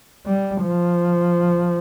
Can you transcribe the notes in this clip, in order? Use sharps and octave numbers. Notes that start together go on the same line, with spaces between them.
G3
F3